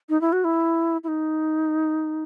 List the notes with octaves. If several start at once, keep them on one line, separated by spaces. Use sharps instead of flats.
D#4
E4
F#4
E4
E4
D#4